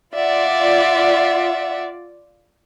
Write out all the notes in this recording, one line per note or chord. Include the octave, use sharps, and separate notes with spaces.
F4 D5 E5 F#5